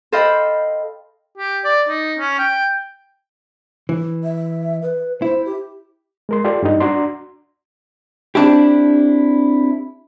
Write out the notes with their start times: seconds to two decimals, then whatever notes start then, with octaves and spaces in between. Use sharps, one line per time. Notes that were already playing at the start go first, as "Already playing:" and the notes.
0.12 A4 C5 D#5 F5 G5 B5
1.38 G4
1.64 D5
1.89 D#4
2.19 C#4
2.38 G5
3.89 E3
4.24 E5
4.82 B4
5.22 E4 C5
5.46 G4
6.29 G#3 A#4 C6
6.44 F4 G4 A4 D5 C6
6.62 G2 G3 D#4
6.80 D4 F#4 D5 A#5 C6
8.35 C4 D4 E4 G4